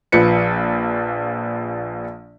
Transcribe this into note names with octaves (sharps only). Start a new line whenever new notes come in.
A#1 F3 B4 C#7